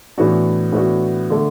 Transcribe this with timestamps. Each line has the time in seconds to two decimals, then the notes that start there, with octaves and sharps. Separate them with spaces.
0.18 A2 E3 B3 D4 F#4
0.72 A2 E3 B3 D4 F#4
1.30 D3 A3